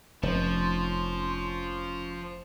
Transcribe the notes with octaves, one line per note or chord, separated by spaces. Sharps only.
F1 F3 C#4 C6 C#6